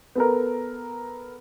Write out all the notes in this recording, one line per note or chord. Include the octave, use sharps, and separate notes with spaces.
B3 A4 A#4